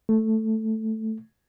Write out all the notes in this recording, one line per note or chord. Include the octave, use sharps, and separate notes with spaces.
A3